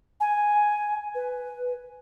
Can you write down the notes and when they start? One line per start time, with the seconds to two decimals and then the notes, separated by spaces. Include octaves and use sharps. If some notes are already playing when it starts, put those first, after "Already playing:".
0.20 G#5
1.15 B4